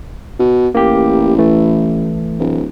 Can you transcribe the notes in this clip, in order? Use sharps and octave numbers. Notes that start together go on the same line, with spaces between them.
B2
A1 A#3 G4
E3 A3
D1